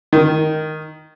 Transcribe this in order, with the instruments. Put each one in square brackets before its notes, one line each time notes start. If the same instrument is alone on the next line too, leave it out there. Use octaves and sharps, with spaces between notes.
[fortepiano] D#3